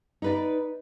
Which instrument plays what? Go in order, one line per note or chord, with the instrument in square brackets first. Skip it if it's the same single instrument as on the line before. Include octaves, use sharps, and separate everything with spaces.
[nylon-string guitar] D#4 B4 D5